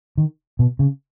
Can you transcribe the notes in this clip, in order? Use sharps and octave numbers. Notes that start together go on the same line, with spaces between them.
D#3
B2
C#3